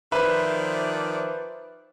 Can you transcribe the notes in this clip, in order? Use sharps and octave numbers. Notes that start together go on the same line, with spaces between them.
D#3 F3 B4 C5 D5 E5